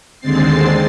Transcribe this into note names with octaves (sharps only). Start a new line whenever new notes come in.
D#2 D3 G#3 C4 A6 C7